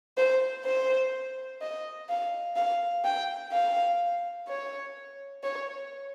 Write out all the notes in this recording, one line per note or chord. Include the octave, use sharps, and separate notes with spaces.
C5
C5
D#5
F5
F5
G5
F5
C#5
C#5